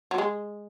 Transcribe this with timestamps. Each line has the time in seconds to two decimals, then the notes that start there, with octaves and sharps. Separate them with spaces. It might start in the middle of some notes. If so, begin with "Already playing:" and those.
0.11 F#3
0.18 G#3